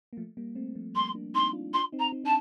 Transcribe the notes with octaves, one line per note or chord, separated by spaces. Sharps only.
A#3
F3 A3
G3 A#3
A3 C4
F3 A3
G3 A#3 C6
A#3 D4
C4 D#4 C6
D4 F4
D4 F4 C6
C4 D#4
A#5
C4 D#4
D4 A5